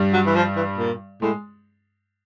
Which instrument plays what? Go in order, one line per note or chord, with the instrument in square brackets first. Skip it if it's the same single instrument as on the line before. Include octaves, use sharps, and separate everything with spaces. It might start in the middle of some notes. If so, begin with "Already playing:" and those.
Already playing: [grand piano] G2 G3
[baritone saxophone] F#3
E3
F3
E3
A#2
[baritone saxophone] A2 [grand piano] G#3